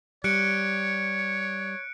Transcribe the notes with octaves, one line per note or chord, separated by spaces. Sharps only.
G3 C#5 F#6 C#7 D7